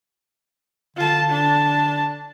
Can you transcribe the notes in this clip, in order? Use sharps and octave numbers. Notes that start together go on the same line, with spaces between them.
D3 F4 A5
D4 A5